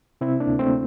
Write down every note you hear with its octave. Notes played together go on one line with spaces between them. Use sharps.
C3 C4 E4
A#3 D4
D2
A3 C4